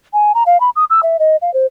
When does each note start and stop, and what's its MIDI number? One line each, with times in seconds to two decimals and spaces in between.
0.13 0.32 80
0.35 0.43 82
0.46 0.60 77
0.60 0.70 83
0.76 0.85 87
0.90 1.01 88
1.03 1.17 76
1.19 1.36 75
1.42 1.53 77
1.54 1.66 72